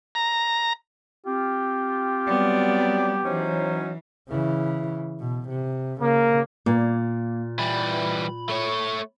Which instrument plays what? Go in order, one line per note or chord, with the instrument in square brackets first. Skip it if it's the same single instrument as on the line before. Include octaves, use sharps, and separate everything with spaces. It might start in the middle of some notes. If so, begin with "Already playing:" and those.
[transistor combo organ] A#5
[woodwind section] C4 F4 [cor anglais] G4
[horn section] F#3 D5 [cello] G3 B3
[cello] E3 [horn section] F#3 C#4 D#4 [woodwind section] C5
[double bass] C#3 E3
B2
C3
[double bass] C#3 [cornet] A#3
[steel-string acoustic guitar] A#2 [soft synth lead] A#3
[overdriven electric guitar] E3 G3 [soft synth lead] B5
[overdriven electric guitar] A3 C#5